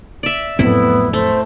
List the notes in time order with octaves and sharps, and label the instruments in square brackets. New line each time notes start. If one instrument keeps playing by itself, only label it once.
[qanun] D5 E5
[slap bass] F2 F#3 C4 [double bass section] A2 [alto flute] B3 [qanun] E4
[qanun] A3 [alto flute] C5